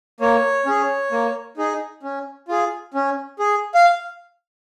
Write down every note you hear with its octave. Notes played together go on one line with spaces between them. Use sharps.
A#3 C#5
C#4 G#4
A#3
D#4 G#4
C#4
F4 G#4
C#4
G#4
F5